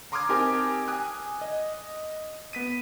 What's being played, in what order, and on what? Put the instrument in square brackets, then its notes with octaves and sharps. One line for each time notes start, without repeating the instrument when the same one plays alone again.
[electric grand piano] A#5 C6 D6 D#6 F6 G#6
C4 D#4 G4 A#4 G#5 A5
G#5 D#6 F#6
D#5
B3 B6 D#7